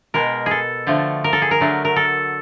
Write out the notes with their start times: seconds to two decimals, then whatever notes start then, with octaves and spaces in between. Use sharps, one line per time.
0.14 B2 G#3 A#4
0.46 G#4 A4
0.87 D3 F3 A3
1.24 A#4
1.33 A4
1.42 G#4
1.51 A#4
1.61 D3 F#3 A3
1.85 A#4
1.96 A4